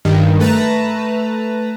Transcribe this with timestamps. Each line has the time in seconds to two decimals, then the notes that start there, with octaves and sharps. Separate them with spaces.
0.05 G2 D#3
0.40 A3 B4 A5 A#5